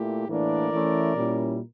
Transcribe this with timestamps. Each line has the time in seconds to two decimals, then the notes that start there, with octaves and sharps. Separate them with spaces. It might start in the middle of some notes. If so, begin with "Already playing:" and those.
Already playing: A#2 A3 E4 G4
0.27 A2 E3 A#3 D4 A#4 D5
0.71 E3 A3 C#4 E4
1.15 A#2 G3 C#4 E4